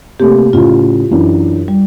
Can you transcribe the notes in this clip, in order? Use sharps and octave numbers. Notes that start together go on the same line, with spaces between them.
C3 A3 A#3 G4
A2 C#3 F4
F#2 E3 D4
G3